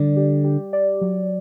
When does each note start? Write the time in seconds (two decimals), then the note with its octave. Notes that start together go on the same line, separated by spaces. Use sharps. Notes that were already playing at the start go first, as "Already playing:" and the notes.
Already playing: D3 G3 D5
0.16 G4
0.44 G4
0.73 D5
1.01 F#3